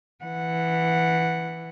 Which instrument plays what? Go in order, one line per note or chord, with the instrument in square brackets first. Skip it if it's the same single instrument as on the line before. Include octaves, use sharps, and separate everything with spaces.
[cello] E3 F#5